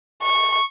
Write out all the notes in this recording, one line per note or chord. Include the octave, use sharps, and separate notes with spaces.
C#6